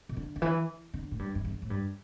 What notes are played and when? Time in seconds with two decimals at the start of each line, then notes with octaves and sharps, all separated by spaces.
0.09 B2
0.17 D3
0.36 D3
0.42 E3
0.94 D3
1.11 A2
1.19 G2
1.35 G2
1.45 E2
1.62 A2
1.70 G2